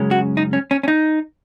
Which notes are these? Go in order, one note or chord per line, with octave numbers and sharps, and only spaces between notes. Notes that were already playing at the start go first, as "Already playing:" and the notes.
Already playing: F#2 C#3 G#3 C#4
F#4
D#4
C#4
C#4
C#4
D#4